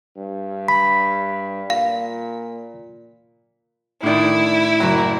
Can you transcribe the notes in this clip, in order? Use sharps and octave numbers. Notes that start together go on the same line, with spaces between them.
G2
B5 B6
A#2 F5
A2 D3 D#3 E4 D5
F#1 F#3 A#5